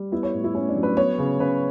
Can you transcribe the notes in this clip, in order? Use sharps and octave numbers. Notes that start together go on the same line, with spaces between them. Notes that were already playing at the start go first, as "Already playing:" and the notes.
Already playing: G3
B3 E4
C#5
A2
E4
A2 C#4
D4
F#3
B4
B3 C#5
C#3
C#3 B4